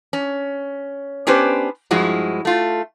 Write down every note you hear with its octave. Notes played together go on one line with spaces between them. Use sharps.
C#4
B3 C#4 D4 G4 B4 C5
G2 F3 G#3 E4 F#4
A3 F4